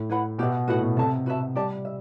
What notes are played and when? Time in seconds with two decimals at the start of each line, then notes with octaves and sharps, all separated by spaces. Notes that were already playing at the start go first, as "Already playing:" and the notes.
Already playing: A2
0.09 E4 B4 F#5 B5
0.38 B2 G4 B4 E5
0.68 A2 F#4 B4 F#5
0.83 B2
0.97 C3 A4 E5 A5
1.26 F#4 B4 E5 A5
1.56 G3 G4 D5 A5
1.85 E5